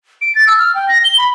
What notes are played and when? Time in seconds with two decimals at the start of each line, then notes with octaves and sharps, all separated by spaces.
0.21 D7
0.35 A6
0.47 E6
0.59 F6
0.75 G5
0.88 A#6
1.04 G7
1.18 B5